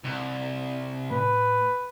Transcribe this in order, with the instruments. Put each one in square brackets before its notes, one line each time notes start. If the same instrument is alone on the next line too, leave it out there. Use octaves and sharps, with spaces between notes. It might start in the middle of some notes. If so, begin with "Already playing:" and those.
[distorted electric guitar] C2
[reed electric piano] A2 [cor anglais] B4